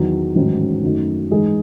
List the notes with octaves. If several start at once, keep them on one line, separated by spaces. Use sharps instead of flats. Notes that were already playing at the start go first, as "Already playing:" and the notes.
Already playing: E2 D#3 F#3
A1 G#2 D#3 F#3 C#4
F#2 D#3 F#3 A3 D#4
G#2 E3 G#3 D#4 G#4